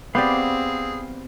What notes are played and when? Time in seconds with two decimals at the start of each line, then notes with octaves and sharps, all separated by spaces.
0.15 B3 C4 G4 G#4 D5 F5 B5 D6